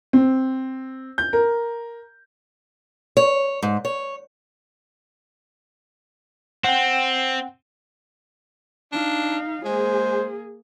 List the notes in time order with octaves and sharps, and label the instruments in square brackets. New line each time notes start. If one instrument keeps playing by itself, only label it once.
[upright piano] C4
G6
A#4
[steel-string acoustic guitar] C#5
G#2
C#5
[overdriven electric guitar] C4 [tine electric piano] F#5 G5
[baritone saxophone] D4 [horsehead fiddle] D#4 F5
[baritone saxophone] G#3 [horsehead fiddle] A#3 G#4 [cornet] C5